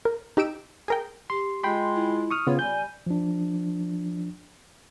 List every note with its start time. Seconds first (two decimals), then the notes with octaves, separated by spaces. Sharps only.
0.05 A#4
0.37 D#4 G4 E6 D7 E7
0.88 G#4 A#4 G5
1.30 G4 C6
1.64 G#3 F4 G5 B5 C6
1.95 E4
2.31 C#6 D#6 F6
2.47 C#3 B3 F4 C#5
2.59 G3 G#5 G6
3.06 F3 D4